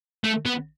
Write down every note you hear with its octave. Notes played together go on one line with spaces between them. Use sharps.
A3
B3